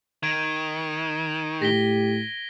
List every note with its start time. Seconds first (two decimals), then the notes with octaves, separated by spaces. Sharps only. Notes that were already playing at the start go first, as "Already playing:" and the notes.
0.23 D#3 G#6 D7 D#7
1.62 A2 G4 A#6 B6 G7